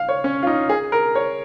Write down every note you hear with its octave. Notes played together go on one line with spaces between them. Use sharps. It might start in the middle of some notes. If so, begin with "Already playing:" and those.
Already playing: F5
C#5
C#4
F4
D#4
G#4
A#4
C#5